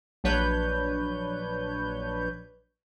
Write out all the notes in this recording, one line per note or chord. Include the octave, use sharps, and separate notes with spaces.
A#1 F#3 D4 B4 C#5 G6